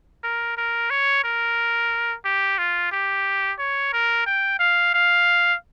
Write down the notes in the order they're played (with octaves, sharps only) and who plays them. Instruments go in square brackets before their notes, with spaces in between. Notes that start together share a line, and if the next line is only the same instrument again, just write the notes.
[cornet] A#4
A#4
C#5
A#4
G4
F4
G4
C#5
A#4
G5
F5
F5